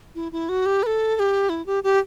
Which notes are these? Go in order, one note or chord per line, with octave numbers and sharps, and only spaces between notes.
E4
E4
F#4
G4
B4
A4
A4
G4
E4
G4
G4